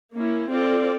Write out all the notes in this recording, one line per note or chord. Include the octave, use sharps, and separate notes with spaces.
A#3 C#4 E4
C4 F4 A4 D5